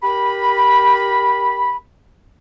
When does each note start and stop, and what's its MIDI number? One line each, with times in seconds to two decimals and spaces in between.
0.02 1.75 67
0.02 1.75 70
0.02 1.75 83